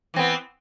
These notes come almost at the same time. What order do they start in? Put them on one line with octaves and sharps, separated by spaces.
E3 C4 B3